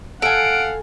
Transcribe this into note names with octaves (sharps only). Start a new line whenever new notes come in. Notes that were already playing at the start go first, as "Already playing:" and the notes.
A4 F5 F#5 G#5 D7